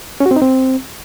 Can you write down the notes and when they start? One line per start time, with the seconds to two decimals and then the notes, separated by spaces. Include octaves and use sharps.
0.20 C#4
0.26 F#4
0.31 C4
0.36 D#4
0.41 C4